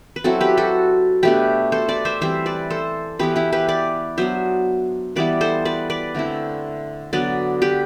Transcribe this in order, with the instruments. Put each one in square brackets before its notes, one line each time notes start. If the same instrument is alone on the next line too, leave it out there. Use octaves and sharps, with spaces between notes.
[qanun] B4
F#3 C4 E4 F#4 A4
G4 B4
F#4 A4
B2 A3 D4 G4 B4
A4 C5
B4 D5
C5 E5
E3 G3 C4 C5 E5
B4 D5
A4 C5
E3 B3 E4 G4 B4
E4 G4
G4 B4
B4 D5
F#3 B3 D4 C5 E5
E3 G3 B3 E4 B4 D5
A4 C5
B4 D5
B4 D5
D3 A3 C4 E4
D3 F#3 B3 D4 B4 D5
G4 B4